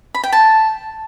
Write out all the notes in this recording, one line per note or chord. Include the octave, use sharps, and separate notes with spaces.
B5
G5
A5